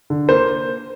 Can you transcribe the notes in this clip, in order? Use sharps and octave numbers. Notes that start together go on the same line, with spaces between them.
D3
A#3 C5